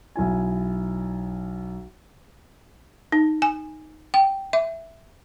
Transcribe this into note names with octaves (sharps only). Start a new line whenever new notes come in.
B1 E4 G#5
D#4
G#5
G5
E5